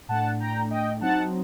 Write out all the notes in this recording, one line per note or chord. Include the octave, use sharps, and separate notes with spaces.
A2 A3 D4 F#5 A5
G5 A#5
D#5 G5
F#3 C4 D#4 F#5 A5